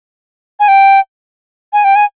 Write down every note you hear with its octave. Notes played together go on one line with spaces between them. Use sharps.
G#5
G5
G#5
G5
G#5